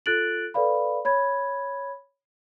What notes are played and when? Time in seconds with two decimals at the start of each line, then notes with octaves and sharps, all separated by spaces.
0.06 F4 A4 F#6 A6 D7 F#7
0.54 A4 B4 D5 F5 B5
1.05 C#5 B5 G#6